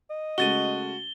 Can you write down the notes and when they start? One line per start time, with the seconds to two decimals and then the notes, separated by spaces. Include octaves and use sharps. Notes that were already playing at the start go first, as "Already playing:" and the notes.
0.10 D#5
0.38 C#3 G#3 A3 F#4 A6 D#7 G7